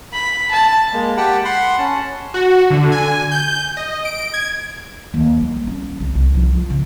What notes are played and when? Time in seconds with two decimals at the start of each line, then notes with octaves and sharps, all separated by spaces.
0.13 B5
0.51 A5
0.93 G#3 A#3
1.17 G4 F#5 G5 A5 B5
1.45 F#5 B5 C6
1.78 C#4 A5
2.34 F#4
2.70 D3
2.92 G#5
3.31 G6
3.77 D#5
4.05 D7
4.34 G#6
5.14 D#2
5.41 G3
5.67 C#4
6.00 C2
6.15 C2
6.34 F3
6.52 F3
6.70 C#3